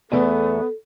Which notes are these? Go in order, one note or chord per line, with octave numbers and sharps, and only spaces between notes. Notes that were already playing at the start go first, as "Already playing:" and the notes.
E2 A3 B3 A4